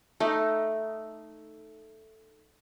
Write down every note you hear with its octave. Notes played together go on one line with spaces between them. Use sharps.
A3 D#4